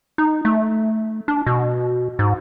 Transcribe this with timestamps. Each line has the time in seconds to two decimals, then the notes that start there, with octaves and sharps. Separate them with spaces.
0.18 D#4
0.45 A3
1.28 D4
1.46 B2
2.19 G#2